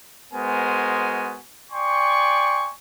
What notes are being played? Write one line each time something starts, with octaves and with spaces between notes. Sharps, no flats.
G#3 B3 F#4 A#4 C5 G#5
D5 G5 G#5 C6 C#6